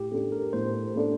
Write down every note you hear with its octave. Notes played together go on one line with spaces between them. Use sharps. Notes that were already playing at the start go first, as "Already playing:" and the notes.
Already playing: A2 G4
A3 D4 A4
A#4
A2 C5
A3 D4 A4